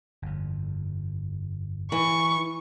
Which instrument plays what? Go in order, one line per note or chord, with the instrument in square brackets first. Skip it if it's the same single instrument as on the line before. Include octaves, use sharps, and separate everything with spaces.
[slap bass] G1 F2
[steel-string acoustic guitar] E3 [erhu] C#6